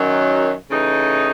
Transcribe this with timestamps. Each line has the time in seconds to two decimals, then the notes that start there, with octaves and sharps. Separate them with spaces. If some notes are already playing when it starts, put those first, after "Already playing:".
Already playing: F#2 D#3 F#3
0.71 C#3 E3 A3 D#4